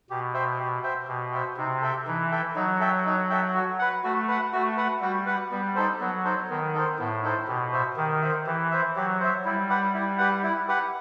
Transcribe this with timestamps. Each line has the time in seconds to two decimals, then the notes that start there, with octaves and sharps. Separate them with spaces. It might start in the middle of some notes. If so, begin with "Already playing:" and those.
0.10 B2 G4
0.34 C5 E5 G5
0.59 G4
0.83 C5 E5 G5
1.08 B2 G4
1.32 C5 E5 G5
1.57 C3 D#4
1.82 A4 E5 G5
2.07 E3 D#4
2.31 A4 E5 G5
2.56 F#3 D#4
2.80 A4 E5 G5
3.06 D#4
3.30 A4 E5 G5
3.55 F#4
3.79 B4 F#5
4.04 A3 F#4
4.28 B4 F#5
4.53 A3 F#4
4.77 B4 F#5
5.01 G3 F#4
5.26 B4 F#5
5.51 G3 B3
5.75 D#4 A4 C5
6.00 F#3 B3
6.24 D#4 A4 C5
6.50 D#3 B3
6.73 D#4 A4 C5
6.99 A2 B3
7.23 D#4 A4 C5
7.48 B2 G4
7.72 C5 E5
7.96 D#3 G4
8.22 C5 E5
8.46 E3 G4
8.71 C5 E5
8.96 F#3 G4
9.20 C5 E5
9.45 G3 E4
9.69 G4 B4 F#5
9.94 E4
10.18 G4 B4 F#5
10.43 E4
10.68 G4 B4 F#5